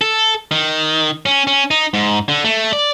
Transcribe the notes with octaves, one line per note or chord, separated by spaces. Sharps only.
A4
D#3
C#4
C#4
D#4
G#2
D3
A3
D5